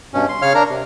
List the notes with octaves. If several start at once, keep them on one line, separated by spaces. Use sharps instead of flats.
G2 B2 C#4
C6
C#3 C#5 F5 F6
D4 A#4 A#5
C3